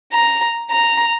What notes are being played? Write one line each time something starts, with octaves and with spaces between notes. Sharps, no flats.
A#5
A#5